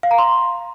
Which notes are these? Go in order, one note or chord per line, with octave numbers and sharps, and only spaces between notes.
F5
A#5
C6